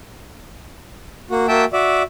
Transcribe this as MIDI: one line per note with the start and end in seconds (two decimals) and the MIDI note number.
1.31 1.47 58
1.31 1.47 66
1.48 1.65 58
1.48 1.65 66
1.48 1.65 76
1.48 1.65 79
1.48 1.65 81
1.73 2.03 66
1.73 2.03 74
1.73 2.03 76